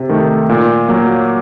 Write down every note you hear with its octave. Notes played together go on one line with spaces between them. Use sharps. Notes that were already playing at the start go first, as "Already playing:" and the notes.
Already playing: C3
D#3 A3
A#2
F#3 A#3